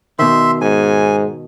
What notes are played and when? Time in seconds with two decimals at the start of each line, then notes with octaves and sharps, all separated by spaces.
0.19 B2 D#3 E5 C6
0.61 G#2 G#5